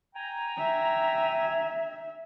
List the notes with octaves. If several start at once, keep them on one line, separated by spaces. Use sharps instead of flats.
G5 G#5 A#5
E5